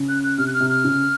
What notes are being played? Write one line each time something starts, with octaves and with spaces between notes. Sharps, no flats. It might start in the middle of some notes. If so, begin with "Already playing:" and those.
Already playing: C#3
F#6
F#6
C3 F6
F#6
F6
C3
F6
C#3